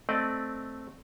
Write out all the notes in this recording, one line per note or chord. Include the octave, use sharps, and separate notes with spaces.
A3 C4 D5 D#5